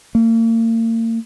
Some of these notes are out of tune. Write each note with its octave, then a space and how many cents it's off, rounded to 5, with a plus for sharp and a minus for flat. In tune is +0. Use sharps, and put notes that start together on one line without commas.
A#3 -40